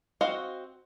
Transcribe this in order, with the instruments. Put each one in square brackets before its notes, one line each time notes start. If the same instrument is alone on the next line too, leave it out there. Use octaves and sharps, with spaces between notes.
[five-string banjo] C4 F#4 D#5 F5 F#5